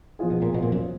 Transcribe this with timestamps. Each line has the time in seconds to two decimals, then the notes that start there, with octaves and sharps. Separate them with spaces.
0.19 F3 B3 F4 G#4
0.30 B2
0.42 A#2
0.54 B2
0.63 A#2
0.72 F#2